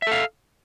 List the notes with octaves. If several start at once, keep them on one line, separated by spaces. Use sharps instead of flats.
A4 E5 F5